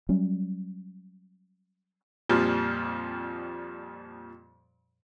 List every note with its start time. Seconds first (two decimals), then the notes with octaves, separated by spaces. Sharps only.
0.09 F#3 G3 C#4
2.29 F2 A#2 F3 G3